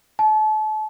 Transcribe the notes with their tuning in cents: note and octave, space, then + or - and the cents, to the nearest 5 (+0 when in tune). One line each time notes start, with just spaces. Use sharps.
A5 -35